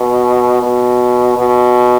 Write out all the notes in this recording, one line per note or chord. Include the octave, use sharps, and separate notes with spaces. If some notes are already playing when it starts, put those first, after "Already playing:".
Already playing: B2
B2
B2